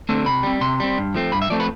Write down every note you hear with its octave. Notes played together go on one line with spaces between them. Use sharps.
D3 A3 C4
C3 B5
G3 C4
C3 C6
G3 C4
G2
F3 A3 C4
G2 B5
E5
F3 A3 C4 D5
B4